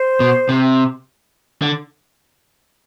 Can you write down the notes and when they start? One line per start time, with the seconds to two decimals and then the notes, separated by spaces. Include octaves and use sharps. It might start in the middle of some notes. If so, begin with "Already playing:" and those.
Already playing: C5
0.20 B2
0.49 C3
1.62 D3